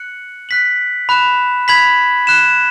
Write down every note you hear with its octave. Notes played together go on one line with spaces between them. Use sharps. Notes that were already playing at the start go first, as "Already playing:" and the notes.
Already playing: F#6 C#7 F#7
F#6 B6 F#7
B5 F#6 E7
B5 G#6 B6 F#7
F#6 E7